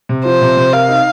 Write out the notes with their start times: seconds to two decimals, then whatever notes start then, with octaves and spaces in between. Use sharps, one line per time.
0.09 C3
0.25 F3 C5
0.42 C3
0.57 C3
0.73 A#4 F5
0.89 D#4